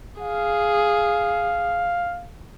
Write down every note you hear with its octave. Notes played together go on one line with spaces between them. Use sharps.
G#4 F5